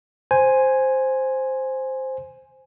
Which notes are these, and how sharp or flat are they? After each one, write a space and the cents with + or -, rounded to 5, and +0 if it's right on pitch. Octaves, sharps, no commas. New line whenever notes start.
C5 +0 G#5 +0